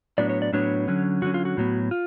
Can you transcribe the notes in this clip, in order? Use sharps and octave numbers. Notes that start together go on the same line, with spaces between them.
A2 F#3 B3 D4 D5
C#5
D5
A2 F#3 B3 D4 C#5
D3 F#3 C#4
D3 F#3 C#4 F#4
F4
F#4
A2 F#3 B3
F4